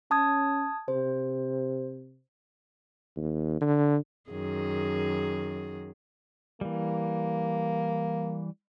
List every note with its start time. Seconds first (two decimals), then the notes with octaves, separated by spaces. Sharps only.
0.11 C#4 A5 D#6 G#6
0.88 C3 C5
3.16 D#2
3.61 D3
4.31 F#2 D#3 G#4
6.61 E3 G3 A#3